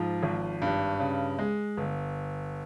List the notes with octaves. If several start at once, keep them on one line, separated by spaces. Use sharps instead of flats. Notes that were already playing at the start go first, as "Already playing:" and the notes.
Already playing: G#2 F3
G#1
G2
C#3
G#3
G1